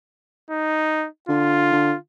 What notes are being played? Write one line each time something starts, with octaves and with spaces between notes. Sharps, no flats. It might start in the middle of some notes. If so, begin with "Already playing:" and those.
D#4
D3 F4
D3